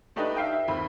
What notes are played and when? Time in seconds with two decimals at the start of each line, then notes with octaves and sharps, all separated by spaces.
0.16 A3 D4 D#4 G4 B4 D#5
0.37 E5 F5 G5
0.52 E5
0.68 D#2 C4 B5